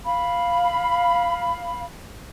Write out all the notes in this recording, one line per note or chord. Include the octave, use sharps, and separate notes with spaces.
F5 B5